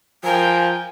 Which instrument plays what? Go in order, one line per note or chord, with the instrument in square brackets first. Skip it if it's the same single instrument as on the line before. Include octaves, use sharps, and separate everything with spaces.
[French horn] F3 [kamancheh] A#4 G5 [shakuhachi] G#5